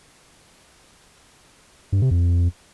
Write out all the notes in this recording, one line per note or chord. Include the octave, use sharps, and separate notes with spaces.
G2
C3
F2